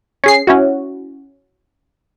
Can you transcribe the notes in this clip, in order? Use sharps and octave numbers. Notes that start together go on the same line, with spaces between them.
C#4 G#4 C7
C#4 E4 F#4